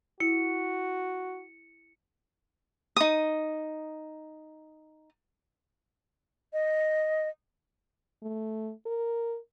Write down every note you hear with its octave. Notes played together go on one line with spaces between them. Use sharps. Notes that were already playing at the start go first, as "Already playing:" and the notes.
E4 F#4 C#7
D#4 D#6
D#5
A3
A#4